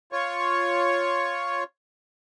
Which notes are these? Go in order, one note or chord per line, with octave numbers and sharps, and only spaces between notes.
F4 C#5 C#6